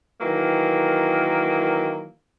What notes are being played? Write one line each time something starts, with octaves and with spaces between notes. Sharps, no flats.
D#3 E3 F#3 A#3